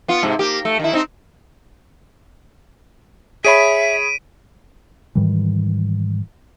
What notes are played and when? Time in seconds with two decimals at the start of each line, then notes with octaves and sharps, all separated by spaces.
0.08 B3 F4
0.23 G#2 C3
0.39 A#3 G4
0.65 A3
0.80 D#3 E4
0.93 C4 D#4
3.45 G#4 C#5 E5 B5 B6 D7 D#7
5.15 G#2 D#3 E3 G3